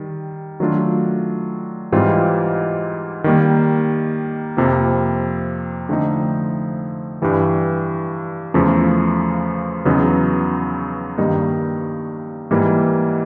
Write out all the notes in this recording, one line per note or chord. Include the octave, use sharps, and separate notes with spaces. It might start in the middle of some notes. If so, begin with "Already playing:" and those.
Already playing: D#3 G3
D#3 F#3 A3 D4 F4
G#2 E3 G3 C4 F4
D#3 G3 A#3
F2 C3 F3 A#3
D3 F3 A3 C4 D#4
G2 E3 G3
E2 C#3 F3 A3
E2 C#3 F#3 B3 D#4
G2 D#3 G3 A#3 D#4
G#2 E3 G3 A#3